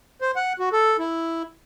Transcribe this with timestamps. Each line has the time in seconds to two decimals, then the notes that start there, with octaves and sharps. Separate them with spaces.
0.21 C5
0.36 F#5
0.59 F#4
0.73 A4
0.99 E4